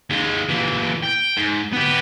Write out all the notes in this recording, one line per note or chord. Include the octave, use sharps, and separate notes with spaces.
D#2 G#3
A#2 E3
G5
G#2
B3 G4